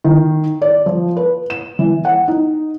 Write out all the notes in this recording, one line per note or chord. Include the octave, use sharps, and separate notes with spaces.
D#3
D5
F3
B4
E7
E3
F#5
D#4